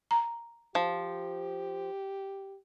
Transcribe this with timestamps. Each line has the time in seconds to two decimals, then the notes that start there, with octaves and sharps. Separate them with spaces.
0.11 A#5
0.75 F3 G4